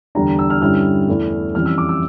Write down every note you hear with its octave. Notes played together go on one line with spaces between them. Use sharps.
E2 D3 G3 D4 A#5
E6
F6
G2 D3 G3 C#4 E4 F6
E2 E3 A3 E4
F2 E3 G3 C#4 F6
E6
D6
E6